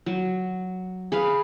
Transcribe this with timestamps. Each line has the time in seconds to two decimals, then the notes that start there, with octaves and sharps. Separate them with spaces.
0.06 F#3
1.12 G#4 B4 F5